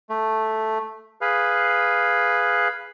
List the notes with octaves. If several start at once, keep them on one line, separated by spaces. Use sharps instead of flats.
A3
G#4 B4 F5